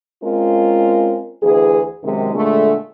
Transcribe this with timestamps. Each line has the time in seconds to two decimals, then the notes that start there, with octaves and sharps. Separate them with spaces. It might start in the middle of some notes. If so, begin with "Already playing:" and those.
0.23 G#3 C4 C#4 F4 A#4
1.41 D2 E3 G#4
2.03 F#2 C3 D#3 G#3
2.34 A#2 D3 G#3 A3